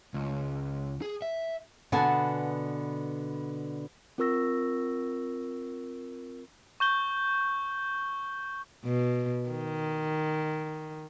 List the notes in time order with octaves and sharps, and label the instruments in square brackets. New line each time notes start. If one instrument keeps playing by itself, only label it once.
[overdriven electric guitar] C#2
G#4
E5
[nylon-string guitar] B2 D3 B3 F#5 G#5 A5
[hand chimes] C4 F4 A#4 C#6 E6 A#6
[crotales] C#6 G6 G7
[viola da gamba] B2
D#3